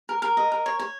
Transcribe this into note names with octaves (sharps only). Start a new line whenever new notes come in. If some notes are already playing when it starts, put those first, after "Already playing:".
A#4
A#4
D#5
A#4
C#5
C#5